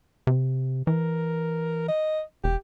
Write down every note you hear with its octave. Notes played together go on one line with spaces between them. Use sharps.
C3
E3 A#4
D#5
E1 G4